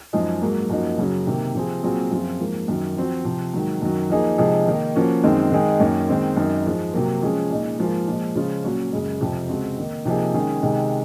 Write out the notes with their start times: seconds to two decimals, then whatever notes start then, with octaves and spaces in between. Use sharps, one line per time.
0.13 F#2 F3 G#3 D#4 G#4
0.41 G#2 F#3 A#3
0.70 F#2 F3 A#3 D#4 F#4
0.98 F#2 C#3 F#3 C#4
1.27 C3 D#3 A#3
1.55 C3 F3 C4 F4 G#4
1.83 A#2 F#3 C4 F4 G#4
2.11 F#2 F3 C4 F4 G#4
2.40 G#2 F3 A#3
2.68 F#2 D#3 F#3
2.96 F3 C4 F#4
3.25 C3 F3 C4
3.53 G#2 D#3 F#3
3.82 F#2 D#3 F#3
4.10 F3 A#3 D#4 G#4
4.38 C3 F3 G#3 D#4 G#4
4.67 D#3 A#3 D#4
4.95 F3 A#3 C#4 F#4
5.23 F#2 D#3 G#3 C4 D#4
5.52 D#3 G#3 D#4 G#4
5.80 F#2 D#3 A#3 C#4
6.09 D#3 G#3 C4
6.37 F#2 D#3 G#3 D#4
6.66 G#2 F3 G#3
6.93 C3 F#3 A#3
7.22 F3 G#3 C#4 G#4
7.50 A#2 G#3 D#4
7.79 G#2 F3 A#3 F4 G#4
8.08 A#2 F3 G#3
8.35 C#3 F3 G#3 C#4 F4
8.64 A#2 F#3 C#4 F#4
8.92 F#2 C#3 G#3
9.21 F2 C3 F3
9.49 C#3 G#3 C4 F#4
9.78 D#3 A#3 D#4
10.05 C3 F3 A#3 D#4 G#4
10.34 D#3 G#3 C#4 G#4
10.62 C3 D#3 G#3 D#4 G#4